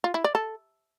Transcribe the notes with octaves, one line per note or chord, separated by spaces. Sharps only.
F4
E4
D5
A4